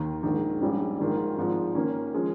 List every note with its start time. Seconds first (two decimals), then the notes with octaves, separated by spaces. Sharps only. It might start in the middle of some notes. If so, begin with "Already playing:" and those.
Already playing: D#2 D#3
0.23 A#1 G#2 D#3
0.61 A#1 G#2 G3 C#4
0.99 A#1 G#2 D#3 A#3 F4
1.37 G#1 G#2 F3
1.75 D#3 A#3 C#4
2.14 F3 G#3 C#4